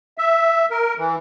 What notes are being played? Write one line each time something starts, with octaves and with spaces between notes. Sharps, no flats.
E5
A#4
E3